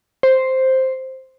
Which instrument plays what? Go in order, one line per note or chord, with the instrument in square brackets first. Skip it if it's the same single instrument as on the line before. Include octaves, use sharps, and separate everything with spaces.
[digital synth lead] C5